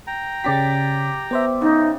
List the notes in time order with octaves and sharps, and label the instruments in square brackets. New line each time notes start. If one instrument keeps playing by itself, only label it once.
[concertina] G5 A#5
[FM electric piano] C#3 C#4 B6 [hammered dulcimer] G4 D5
[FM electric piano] B3 C5 E5
[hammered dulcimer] C#3 [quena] D#4